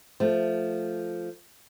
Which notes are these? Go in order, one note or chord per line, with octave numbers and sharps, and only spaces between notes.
F3 A3